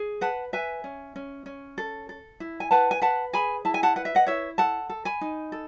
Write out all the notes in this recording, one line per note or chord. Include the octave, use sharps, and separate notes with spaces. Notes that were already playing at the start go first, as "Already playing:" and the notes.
Already playing: G#4
B4 F#5 A5
B4 E5 G#5
C#4
C#4
C#4
A4
A4
E4
G#5
B4 F#5 A5
G#5
B4 F#5 A5
G#4 G#5 B5
E4 A5
G#5
F#5 A5
B4 F#5
E5
D#5 F#5
E4 C#5 E5
A4 F#5 A5
A4
G#5 B5
D#4
A4